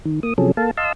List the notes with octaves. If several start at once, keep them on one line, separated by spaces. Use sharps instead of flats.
D#3
A#3 D#6
C3 F3 F#3 C#4 G#4 A4
A#3 A4 F5 A5
D#5 F5 A5 C6 E6